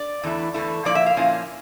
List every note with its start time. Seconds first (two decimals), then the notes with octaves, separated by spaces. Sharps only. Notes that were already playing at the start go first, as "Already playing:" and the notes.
Already playing: D5
0.23 E2 E3 A3 E4
0.54 E2 E3 A3 E4
0.85 A#2 F3 A#3 E4 D5
0.95 E5
1.06 F5
1.17 A#2 F3 A#3 C#4 E4